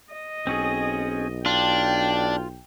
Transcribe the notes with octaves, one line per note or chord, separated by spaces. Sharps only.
D#5
B1 C4 C#4 G#4
D4 F4 G5